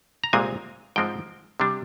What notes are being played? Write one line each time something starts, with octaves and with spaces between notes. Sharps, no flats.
A#5
C2 A#2 G#3 C4 G#5
G#2 F3 G#3 C4 G5
C3 G3 D4